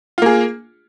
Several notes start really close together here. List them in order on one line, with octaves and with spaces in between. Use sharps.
F4 A#3 G#4